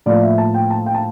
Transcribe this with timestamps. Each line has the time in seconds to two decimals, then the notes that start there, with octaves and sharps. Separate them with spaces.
0.06 A2 F3 A#3 D5
0.22 E5
0.38 A5
0.54 G5
0.71 A5
0.86 G5
0.95 A5